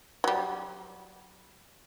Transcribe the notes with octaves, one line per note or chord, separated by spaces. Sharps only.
F#3 G3